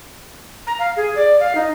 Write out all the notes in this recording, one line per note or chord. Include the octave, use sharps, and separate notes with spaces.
A#5
F5
G#4
D5
F5
D#4